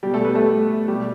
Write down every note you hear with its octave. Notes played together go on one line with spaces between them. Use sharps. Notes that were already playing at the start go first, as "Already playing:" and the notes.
B2 G3 G4
A3 A4
B3 B4
A3 A4
B2 G3 G4